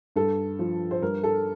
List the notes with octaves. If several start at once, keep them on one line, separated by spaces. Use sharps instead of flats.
G2 A4
F3
C5
G2 A#4
A4